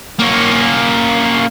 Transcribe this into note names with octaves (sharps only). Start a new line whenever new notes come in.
A#3 C#4